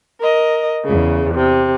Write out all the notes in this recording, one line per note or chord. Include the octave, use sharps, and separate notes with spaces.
A#4 D#5
E2 C#3
C3